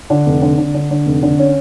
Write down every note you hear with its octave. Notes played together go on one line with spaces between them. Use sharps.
D3 D4
F1
D3
D3
D3
D3
F1
D3
C#4